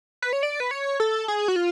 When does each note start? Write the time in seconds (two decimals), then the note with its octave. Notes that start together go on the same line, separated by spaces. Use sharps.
0.22 B4
0.33 C#5
0.43 D5
0.60 B4
0.71 C#5
1.00 A4
1.28 G#4
1.48 F#4
1.56 F4